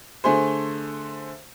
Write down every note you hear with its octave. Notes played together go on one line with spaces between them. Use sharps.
D3 A3 G#4 C5